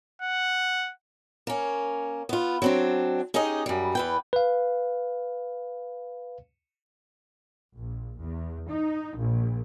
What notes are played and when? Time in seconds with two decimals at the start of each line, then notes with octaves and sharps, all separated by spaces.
0.22 F#5
1.47 A#3 C#4
2.29 B3 F4
2.62 F#3 C4 D4
3.34 C#4 D#4 G4 G#4 D#5
3.66 F#2 G3
3.95 E2 B4 G5
4.33 B4 F5
7.76 A#1
8.19 E2
8.69 D#4
9.16 A#1